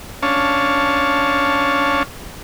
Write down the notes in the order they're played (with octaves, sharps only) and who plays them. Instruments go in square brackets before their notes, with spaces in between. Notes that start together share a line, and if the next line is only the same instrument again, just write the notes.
[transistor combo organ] C#4 D4 C#5 F5 A5